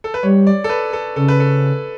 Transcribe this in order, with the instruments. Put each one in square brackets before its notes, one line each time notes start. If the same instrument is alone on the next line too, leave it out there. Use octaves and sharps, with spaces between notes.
[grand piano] A4
B4
[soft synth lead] G3 [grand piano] C#5
[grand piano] D5
A4
B4
A4
[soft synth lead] C#3 [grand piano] A4
[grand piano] B4
A4